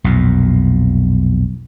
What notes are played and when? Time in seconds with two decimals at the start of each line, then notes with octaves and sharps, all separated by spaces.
0.04 B1 F2 A#2